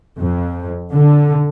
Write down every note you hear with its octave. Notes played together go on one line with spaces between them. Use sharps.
F2
D3